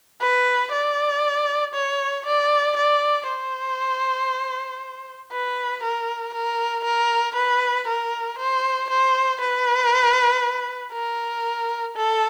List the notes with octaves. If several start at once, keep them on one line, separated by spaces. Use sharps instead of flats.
B4
D5
C#5
D5
D5
C5
B4
A#4
A#4
A#4
B4
A#4
C5
C5
B4
A#4
A4